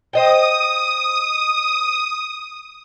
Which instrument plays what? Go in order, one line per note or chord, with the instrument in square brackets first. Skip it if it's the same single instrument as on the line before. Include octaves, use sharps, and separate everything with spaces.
[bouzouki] C5 D#5 G5 [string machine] D#6